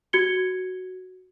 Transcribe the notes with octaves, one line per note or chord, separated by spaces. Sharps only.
F#4 G#6 C#7 G7